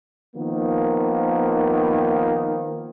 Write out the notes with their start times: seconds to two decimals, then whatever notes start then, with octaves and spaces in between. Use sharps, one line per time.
0.36 D#3 F3 A#3 B3